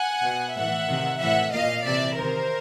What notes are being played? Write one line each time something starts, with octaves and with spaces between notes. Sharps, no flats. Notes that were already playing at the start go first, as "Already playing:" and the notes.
Already playing: F#5 G#5
B2
A2 E3 E5 F#5
C3 D#3
A2 E3 E5 F#5
A#2 D#5 F5
C3 E3 D5 E5
C3 D#3 A#4 C5